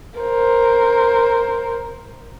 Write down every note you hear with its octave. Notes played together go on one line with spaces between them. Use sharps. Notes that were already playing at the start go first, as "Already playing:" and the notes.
A#4 C5